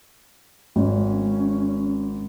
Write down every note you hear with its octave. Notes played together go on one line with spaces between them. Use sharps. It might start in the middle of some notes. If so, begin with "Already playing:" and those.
G#1 C#4